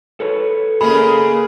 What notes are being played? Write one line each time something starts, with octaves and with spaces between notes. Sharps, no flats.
A4 B4 C#5
C#3 G#3 A#3 G#4 B5